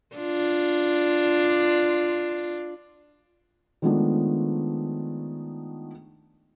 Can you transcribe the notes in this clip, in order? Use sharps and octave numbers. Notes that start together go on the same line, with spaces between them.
D4 F4
D#3 F3 G#3 A3 B3 D4